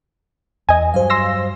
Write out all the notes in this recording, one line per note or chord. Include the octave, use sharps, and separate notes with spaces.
E2 D#5 G#5
G2 F#3 C5 F5
C6 E6 A#6